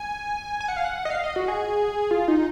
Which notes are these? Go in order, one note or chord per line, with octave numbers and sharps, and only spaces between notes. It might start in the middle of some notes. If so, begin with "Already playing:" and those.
Already playing: G#5
G#5
F#5
F5
F#5
D#5
F5
D#5
F#4
G#4
F4
D#4